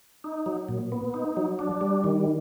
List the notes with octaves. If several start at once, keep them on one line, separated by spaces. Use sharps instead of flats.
D#4
F#3
A#2
B3
D#4
F#3
D4
G3
D#3